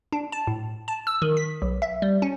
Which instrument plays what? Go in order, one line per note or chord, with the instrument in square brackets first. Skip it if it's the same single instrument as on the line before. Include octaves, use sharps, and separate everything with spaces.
[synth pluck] D4
A5
A2
A5
E6
D#3
B6
B1
E5
G3
C#4